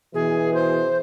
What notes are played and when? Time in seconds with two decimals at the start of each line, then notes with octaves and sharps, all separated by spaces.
0.14 B2 E3 G#4
0.54 C5